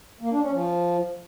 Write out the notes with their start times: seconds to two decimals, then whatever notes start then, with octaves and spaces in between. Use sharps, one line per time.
0.21 A#3
0.31 D4
0.41 C#4
0.51 F3